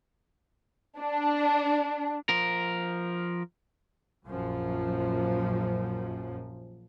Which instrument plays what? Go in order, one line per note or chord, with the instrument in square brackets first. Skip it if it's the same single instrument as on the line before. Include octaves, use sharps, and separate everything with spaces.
[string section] D4
[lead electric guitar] F3 A#4
[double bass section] A#1 F#2 F3